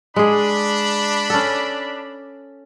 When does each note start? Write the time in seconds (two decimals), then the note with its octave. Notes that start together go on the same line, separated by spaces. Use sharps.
0.16 G#3 D4 G#4 B5
1.30 C#4 A4